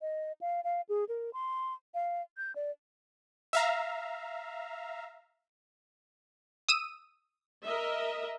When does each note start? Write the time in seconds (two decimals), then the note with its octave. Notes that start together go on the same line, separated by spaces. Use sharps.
0.01 D#5
0.41 F5
0.64 F5
0.89 G#4
1.09 A#4
1.33 C6
1.94 F5
2.37 G6
2.55 D5
3.53 E5 F5 A#5
6.69 D#6 E6 D#7
7.65 A#4 D#5 E5